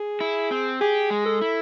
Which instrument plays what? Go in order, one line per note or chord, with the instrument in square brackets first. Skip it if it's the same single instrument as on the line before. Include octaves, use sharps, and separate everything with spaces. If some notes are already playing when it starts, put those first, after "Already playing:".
Already playing: [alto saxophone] G#4
[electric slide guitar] E4
C4
[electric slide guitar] G4 [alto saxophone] G#4
[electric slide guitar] G#3
[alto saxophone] A4
[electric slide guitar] E4